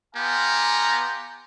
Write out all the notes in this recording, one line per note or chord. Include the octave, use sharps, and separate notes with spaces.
B3 G4 F5 G#5 A#5 C6